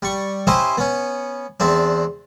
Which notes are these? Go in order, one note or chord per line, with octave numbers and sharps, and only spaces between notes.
G3 C#6
C#4 E4 G4 C5 D#5
B3 C#4
E2 C4 D4